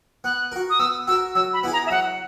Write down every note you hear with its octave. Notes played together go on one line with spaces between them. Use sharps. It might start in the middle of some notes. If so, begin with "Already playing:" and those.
B3 F#6
F#4 A#4
D#6
B3 E6
F#4 A#4 E6
F#3 E6
B5
B3 E4 G#4
A#5
E5
F#3 F#5